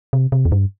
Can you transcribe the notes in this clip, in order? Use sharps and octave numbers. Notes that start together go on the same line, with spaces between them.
C3
C3
E2
G2